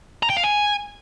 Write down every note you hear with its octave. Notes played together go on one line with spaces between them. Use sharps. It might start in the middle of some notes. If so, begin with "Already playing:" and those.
A#5
G5
F5
G#5